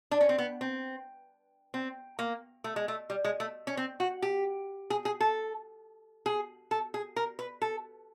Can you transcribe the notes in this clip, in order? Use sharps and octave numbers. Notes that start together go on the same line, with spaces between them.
D4
C#4
C4
B3
C4
C4
A#3
A3
G#3
A3
G3
G#3
A3
C#4
C4
F#4
G4
G#4
G#4
A4
G#4
A4
G#4
A#4
B4
A4